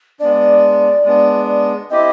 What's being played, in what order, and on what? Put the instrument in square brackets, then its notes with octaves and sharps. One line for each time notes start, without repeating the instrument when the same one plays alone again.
[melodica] G#3 B3 D4 [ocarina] D5
[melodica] G#3 B3 D4
[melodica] C4 E4 G4 [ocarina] D#5